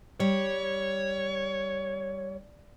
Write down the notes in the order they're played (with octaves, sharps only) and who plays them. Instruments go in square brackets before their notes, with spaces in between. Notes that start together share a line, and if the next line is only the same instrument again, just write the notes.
[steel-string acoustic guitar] G3 [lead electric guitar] C#5